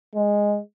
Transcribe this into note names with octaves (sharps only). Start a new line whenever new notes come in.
G#3